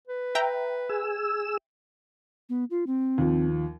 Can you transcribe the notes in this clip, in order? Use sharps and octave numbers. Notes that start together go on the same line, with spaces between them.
B4
E5 G5 A#5
G#4 E6
B3
F4
C4
D#2 F3